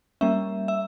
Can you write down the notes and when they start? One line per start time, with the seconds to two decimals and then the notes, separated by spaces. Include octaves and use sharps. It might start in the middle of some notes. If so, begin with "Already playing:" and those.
0.21 G3 A#3 C#4 E5
0.68 E5